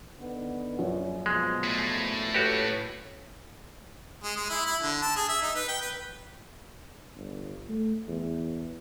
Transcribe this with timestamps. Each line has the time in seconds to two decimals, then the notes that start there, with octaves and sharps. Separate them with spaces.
0.20 D3 D#3 B3
0.79 A#1 F#2 C#5
1.26 B2 F3 G#3
1.63 A2
2.34 F#4 G4 A4 B4 C#5
4.24 G#3
4.37 G#3
4.50 E4
4.65 E4
4.82 D3
5.02 A5
5.16 G#4
5.29 E5
5.42 D#4
5.55 B4
5.68 G5
5.82 B4
7.15 G1
7.69 A3
8.08 E2